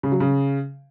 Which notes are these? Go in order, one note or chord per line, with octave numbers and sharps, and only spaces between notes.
C#3
F#3
C#3